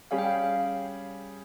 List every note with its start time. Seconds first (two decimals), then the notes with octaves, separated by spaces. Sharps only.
0.11 G3 C#4 G#4 F5
0.18 G5
0.25 F5